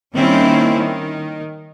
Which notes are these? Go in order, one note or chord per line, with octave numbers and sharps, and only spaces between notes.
D#3 G3 A#3 C4 C#4 E4
D#3